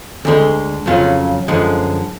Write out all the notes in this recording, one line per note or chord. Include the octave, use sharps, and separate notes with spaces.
D2 D3 G#3
F2 C#3 F#3 C#4 F4
F#2 D3 F3 G#3